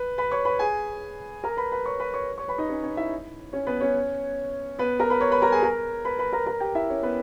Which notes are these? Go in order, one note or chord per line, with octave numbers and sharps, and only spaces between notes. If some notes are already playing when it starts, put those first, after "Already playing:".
Already playing: B4
B4 B5
C#5 C#6
B4 B5
G#4 G#5
A#4 A#5
B4 B5
B4 B5
C#5 C#6
B4 B5
C#5 C#6
C#5 C#6
B4 B5
D#4 D#5
C#4 C#5
C#4 C#5
E4 E5
C#4 C#5
B3 B4
C#4 C#5
B3 B4
A#4 A#5
B4 B5
C#5 C#6
B4 B5
A#4 A#5
G#4 G#5
A#4 A#5
B4 B5
B4 B5
A#4 A#5
A#4 A#5
G4 G5
E4 E5
C#4 C#5
B3 B4